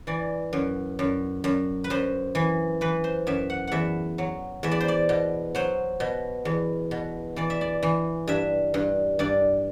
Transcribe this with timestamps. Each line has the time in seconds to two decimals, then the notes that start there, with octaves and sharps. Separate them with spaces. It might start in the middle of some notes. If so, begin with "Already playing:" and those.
0.07 E3 D5
0.53 F#2
0.99 F#2
1.44 F#2
1.84 B4
1.90 F#2 C5
2.35 E3
2.81 E3 B4
3.04 C5
3.27 F#2 E5
3.50 F#5
3.67 E2 E5 F#5
4.18 F#3
4.63 E2 E5
4.71 D5
4.81 C5
4.88 D5
5.09 B2
5.55 F#3 C5
6.00 B2
6.45 E2
6.91 B2
7.36 E3 D5
7.50 E5
7.61 D5
7.83 E3
8.28 G2 E5
8.74 G2
9.19 G2 D5